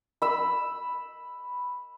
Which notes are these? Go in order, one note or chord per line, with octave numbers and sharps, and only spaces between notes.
B5 E6